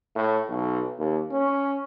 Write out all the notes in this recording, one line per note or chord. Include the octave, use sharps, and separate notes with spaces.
A2
B1
D#2
C#4